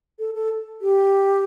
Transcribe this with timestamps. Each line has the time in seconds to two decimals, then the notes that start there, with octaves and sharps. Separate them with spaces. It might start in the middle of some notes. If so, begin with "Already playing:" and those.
0.19 A4
0.34 A4
0.81 G4